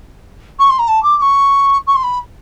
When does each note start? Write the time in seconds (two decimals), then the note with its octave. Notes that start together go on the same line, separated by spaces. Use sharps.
0.59 C#6
0.69 C6
0.78 A#5
0.88 A5
1.03 D6
1.17 D6
1.21 C#6
1.87 C#6
1.95 C6
2.03 B5